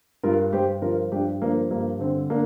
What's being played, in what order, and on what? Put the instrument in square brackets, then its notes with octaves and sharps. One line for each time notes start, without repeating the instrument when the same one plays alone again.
[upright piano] G2 F4 A#4
G2 G4 C5
F3 F4 A#4
G2 D4 G4
F3 A#3 D4
G2 A#3
D3 C4
A#3 D4